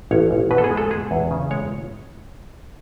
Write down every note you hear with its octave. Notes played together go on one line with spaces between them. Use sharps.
A1 C#5
A1
B2 B4
A4
G#4
G#3
A4
G#3 G#4
E2
C#3
G#3 C#5